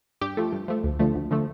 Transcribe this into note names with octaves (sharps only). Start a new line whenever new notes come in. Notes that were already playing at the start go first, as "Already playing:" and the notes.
G2 G4
F3 A3
G2
F3 A3
D2
D3 F3 A3
D2
D3 F3 A3